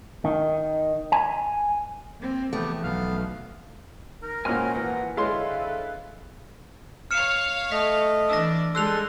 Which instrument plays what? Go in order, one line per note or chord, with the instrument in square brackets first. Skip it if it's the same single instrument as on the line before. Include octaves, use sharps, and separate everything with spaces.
[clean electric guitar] D#3
G#5
[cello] A#3 C4
[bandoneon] E2 B3 G4 [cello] E3 F3 [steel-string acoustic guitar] A3
[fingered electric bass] B1 [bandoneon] B3 F5 F6
[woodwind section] D#4 A#4
[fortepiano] G#1 A#2 [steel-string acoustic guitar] C#4 F#4 [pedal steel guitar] G#5 F6
[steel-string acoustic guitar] E3 F3 B3 [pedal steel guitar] F#5
[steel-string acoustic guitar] D3 E4 C#5 [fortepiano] G#3 C6 [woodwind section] A4 B4 [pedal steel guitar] F5
[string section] C#5 F5 [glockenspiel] F6 C#7 E7
[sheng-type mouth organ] A3 D#5 [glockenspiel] B6
[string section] E3 D4 [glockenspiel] E6 A#6
[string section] G3 G#3 [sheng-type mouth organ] A4 C6 [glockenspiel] E6 F#6 F7